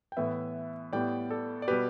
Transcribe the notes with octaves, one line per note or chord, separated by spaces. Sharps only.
G5
A2 E3 B3 B4 E5
A2 G3 B3 D5 G5
A4 D5
D5
B2 G3 G4 B4